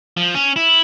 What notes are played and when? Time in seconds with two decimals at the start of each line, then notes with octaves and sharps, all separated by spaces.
0.17 F3
0.35 C#4
0.56 E4